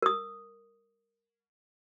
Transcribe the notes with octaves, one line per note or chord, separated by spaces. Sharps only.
A#4 D#6